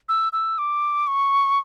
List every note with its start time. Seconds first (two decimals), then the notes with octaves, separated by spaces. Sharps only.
0.09 E6
0.33 E6
0.58 D6
1.07 C#6